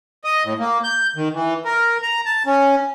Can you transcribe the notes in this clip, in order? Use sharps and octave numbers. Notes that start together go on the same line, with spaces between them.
D#5
A2
A#3
G6
D#3
E3
A#4
A#5
A5
C#4